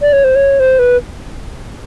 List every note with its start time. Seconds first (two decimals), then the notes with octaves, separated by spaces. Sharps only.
0.02 D5
0.13 C#5
0.24 C5
0.36 C#5
0.60 C5
0.79 B4